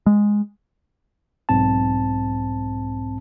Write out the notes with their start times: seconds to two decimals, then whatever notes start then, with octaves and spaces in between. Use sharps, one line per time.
0.06 G#3
1.49 B1 G#2 C4 A5